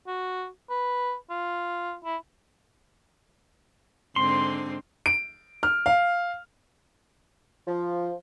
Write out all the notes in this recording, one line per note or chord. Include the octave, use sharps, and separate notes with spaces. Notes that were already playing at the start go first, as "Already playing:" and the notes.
F#4
B4
F4
E4
G#2 D3 C4 C6
D7
F6
F5
F3